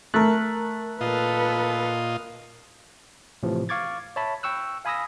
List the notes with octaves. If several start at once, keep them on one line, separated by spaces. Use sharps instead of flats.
A3 A#4 F#6
A#2 F4 A4 B4 D#5
A2 C3 E3 F3
F5 C#6 D6 G#6 A6
C#5 E5 A5 B5
G5 C#6 E6 F#6
F5 G#5 B5 D#6 E6 A#6